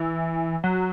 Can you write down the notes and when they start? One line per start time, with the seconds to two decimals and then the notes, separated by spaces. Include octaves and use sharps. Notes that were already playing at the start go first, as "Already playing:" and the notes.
Already playing: E3
0.64 F#3